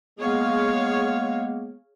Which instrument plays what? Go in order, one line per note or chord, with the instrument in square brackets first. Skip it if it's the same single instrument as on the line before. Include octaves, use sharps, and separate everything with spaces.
[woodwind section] G#3 A#3 B3 [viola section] G#4 C#5 F5